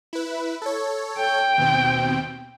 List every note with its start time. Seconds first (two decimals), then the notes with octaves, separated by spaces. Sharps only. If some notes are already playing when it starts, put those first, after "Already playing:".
0.13 E4 B4
0.62 A4 C#5
1.18 G5
1.58 D#2 B2 C4